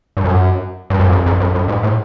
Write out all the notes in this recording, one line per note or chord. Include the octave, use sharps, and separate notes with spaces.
G2
F#2
G2
F#2
F2
F2
F#2
F#2
G#2
A2